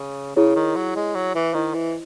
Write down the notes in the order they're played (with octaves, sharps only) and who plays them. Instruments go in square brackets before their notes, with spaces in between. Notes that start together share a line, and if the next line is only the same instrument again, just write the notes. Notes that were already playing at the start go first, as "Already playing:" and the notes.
Already playing: [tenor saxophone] C#3
[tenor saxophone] C#3 [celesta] E4 G#4 C#5
[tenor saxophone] D#3
F#3
G#3
F#3
E3
[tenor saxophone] D#3 [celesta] E4 C5 D#5
[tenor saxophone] E3